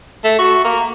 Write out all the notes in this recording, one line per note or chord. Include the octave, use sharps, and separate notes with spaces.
A3
F#4
A#3